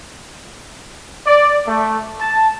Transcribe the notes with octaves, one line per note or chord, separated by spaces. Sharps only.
D5
A3
A5